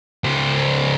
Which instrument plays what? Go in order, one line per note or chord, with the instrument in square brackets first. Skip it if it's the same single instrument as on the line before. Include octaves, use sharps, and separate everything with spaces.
[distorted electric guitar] C#2 C5